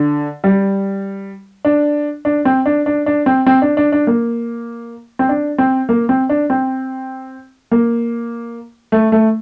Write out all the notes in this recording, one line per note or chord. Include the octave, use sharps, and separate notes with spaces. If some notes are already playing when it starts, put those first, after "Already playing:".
Already playing: D3
G3
D4
D4
C4
D4
D4
D4
C4
C4
D4
D4
D4
A#3
C4
D4
C4
A#3
C4
D4
C4
A#3
A3
A3